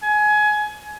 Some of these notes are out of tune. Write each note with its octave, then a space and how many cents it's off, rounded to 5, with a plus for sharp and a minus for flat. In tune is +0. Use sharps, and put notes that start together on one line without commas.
G#5 +20